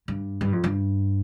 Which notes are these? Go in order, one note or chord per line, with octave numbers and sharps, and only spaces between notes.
G2
G2
F2
G2